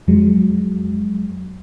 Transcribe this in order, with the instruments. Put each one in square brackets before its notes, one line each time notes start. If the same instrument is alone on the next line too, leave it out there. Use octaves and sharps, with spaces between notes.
[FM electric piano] F2 F#3 G#3